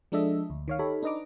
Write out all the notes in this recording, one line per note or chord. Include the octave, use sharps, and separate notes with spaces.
F3 G#3 D4 A4 D#5 E5
D2
D#3 C#5 F5
D#4 G4 A4 C#5 B5
D4 D#4 B4 D#5 A#5 D6